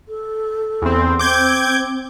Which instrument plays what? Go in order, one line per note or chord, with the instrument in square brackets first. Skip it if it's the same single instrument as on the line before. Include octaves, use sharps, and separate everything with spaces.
[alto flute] A4
[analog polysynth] E2 C4
[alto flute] C4 [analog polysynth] D6 G6 G#6